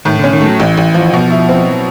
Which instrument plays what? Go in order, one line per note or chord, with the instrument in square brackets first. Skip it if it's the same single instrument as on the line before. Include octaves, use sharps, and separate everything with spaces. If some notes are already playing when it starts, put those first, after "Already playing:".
[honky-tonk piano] A2 [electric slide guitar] D#3
[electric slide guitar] D3 [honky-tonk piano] C#4
[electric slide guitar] D#3
[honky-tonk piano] A3
[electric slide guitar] F#3
[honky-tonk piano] A1 [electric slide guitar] E3
[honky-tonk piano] A1
F3
[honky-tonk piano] B2 [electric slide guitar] F3
[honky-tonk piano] E4
C4
[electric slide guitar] F#3